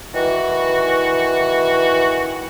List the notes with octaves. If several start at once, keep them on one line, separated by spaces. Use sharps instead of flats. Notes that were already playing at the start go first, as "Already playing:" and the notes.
D#3 E3 F#4